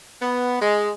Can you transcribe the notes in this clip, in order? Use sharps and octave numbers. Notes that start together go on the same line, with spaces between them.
B3
G#3